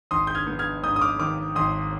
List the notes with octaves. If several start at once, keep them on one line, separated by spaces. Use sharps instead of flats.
G#1 C6 D#6
G6
F6 G#6
B3
F6 G#6
G#2 D#6 G6
D#6
D6 F6
D#3 D6 F6
G#1 C6 D#6